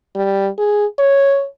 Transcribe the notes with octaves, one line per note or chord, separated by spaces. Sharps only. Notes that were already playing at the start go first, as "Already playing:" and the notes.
G3
G#4
C#5